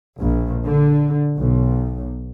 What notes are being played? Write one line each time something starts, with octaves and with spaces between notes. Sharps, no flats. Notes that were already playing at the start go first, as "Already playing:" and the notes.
A#1
D3
B1